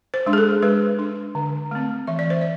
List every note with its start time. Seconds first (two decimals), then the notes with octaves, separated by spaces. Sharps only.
0.14 C5
0.26 G#3 D4
0.33 G#4
0.38 A4
0.63 G#3 B4
0.99 D4
1.35 D3
1.71 A3 C4
2.07 E3 E5
2.19 D5
2.30 C5
2.41 D5